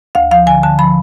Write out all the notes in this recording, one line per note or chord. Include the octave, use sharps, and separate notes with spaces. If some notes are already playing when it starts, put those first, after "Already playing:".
D2 F5
F3 F5
D3 G#5
D3 A5
F3 B5